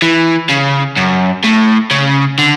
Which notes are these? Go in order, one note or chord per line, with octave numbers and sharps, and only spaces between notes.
E3
C#3
F#2
A2
C#3
D3